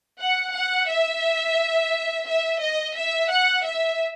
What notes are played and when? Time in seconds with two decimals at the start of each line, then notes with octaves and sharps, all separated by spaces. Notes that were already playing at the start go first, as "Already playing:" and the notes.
0.20 F#5
0.55 F#5
0.89 E5
2.27 E5
2.60 D#5
2.96 E5
3.30 F#5
3.64 E5